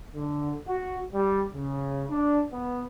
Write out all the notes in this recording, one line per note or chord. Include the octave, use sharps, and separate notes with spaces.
D3
F#4
G3
C#3
D4
B3